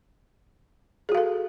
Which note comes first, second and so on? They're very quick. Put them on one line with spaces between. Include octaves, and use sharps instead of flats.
G#4 F#4 F5 A4